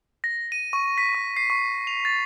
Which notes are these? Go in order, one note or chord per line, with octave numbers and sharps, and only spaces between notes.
A#6
D#7
C#6
B6
C#6
C7
C#6
F7
A6